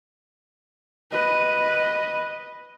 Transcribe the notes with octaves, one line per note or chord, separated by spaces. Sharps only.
B4 D#5